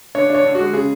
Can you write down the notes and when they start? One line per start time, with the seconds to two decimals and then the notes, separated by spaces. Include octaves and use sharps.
0.15 D3 C#5
0.30 D4 C#5
0.45 D3
0.55 G#3 F#4
0.73 C#3 G#4